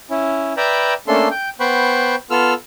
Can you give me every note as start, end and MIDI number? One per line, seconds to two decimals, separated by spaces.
0.10 0.54 61
0.10 0.54 64
0.57 0.94 71
0.57 0.94 74
0.57 0.94 76
0.57 0.94 79
0.57 0.94 82
0.57 0.94 83
1.08 1.28 57
1.08 1.28 58
1.08 1.28 61
1.08 1.28 62
1.08 1.28 69
1.08 1.28 84
1.31 1.49 79
1.60 2.15 59
1.60 2.15 72
1.60 2.15 78
1.60 2.15 79
1.60 2.15 83
1.60 2.15 85
2.30 2.54 59
2.30 2.54 65
2.30 2.54 69
2.30 2.54 88
2.30 2.54 89